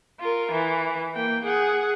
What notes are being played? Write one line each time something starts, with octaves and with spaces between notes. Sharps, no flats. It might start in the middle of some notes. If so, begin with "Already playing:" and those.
F4 A#4
E3
A#3 G5
G#4 F#5